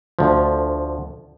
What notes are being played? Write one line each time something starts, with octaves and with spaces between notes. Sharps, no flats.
D2 F3